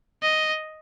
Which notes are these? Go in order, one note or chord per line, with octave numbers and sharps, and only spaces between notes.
D#5